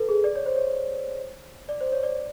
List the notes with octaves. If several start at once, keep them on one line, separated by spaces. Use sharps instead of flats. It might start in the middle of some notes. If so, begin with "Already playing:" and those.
Already playing: A4 B4
G#4
D5
C#5
C5
C#5
D5
C5
C#5
D5